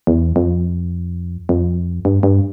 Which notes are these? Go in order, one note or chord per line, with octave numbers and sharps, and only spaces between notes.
E2
F2
F2
G2
G2